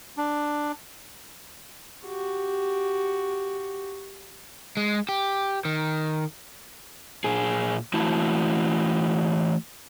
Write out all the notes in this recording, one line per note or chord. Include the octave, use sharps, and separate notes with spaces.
D4
F#4 G4
G#3
G4
D#3
A#2 G#4
E3 A3 E4 F#4 A5